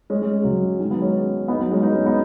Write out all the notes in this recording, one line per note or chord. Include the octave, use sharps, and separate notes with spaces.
G#3 C#4
G#3 C#4
C#3 F#3
D#3 G#3
F#3 B3
G#3 C#4
B3 D#4
F#3 B3
G#3 C#4
B3 D#4
G#3 C#4
B3 D#4